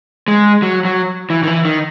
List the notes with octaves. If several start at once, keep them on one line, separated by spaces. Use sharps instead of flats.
G#3
F#3
F#3
E3
D#3
E3
D#3